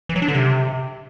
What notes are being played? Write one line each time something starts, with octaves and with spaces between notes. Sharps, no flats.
E3
F#3
D4
D3
C3